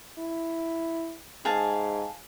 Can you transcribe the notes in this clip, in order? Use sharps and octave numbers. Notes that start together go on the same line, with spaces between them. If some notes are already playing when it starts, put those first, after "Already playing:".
E4
G#2 G#4 F5 A5